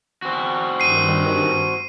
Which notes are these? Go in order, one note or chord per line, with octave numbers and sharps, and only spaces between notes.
C4 F#4
G2 D#3 C7 D#7